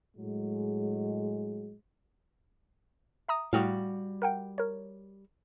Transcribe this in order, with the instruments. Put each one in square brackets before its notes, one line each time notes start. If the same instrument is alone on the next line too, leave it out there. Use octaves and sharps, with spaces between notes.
[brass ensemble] A2 F#3 G#3
[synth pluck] E5 A#5 D#6
[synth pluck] A2 G5 D#6 [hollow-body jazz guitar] G3 F#4 F5
[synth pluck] A#4 F#5 G5
A#4 C#5